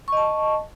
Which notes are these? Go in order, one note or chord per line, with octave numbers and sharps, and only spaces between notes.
D#5 A5 C#6